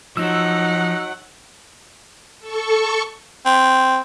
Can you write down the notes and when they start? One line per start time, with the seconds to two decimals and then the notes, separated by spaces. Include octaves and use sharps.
0.17 F3 F#3 D#4 F#5 E6
2.40 A4 C#6
3.46 C4